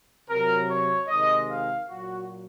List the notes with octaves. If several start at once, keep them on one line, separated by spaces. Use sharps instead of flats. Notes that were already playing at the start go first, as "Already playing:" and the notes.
C3 F#3 A#4
C#5
C3 D#3 G#3 D#5
F5
A#2 F#3 F#4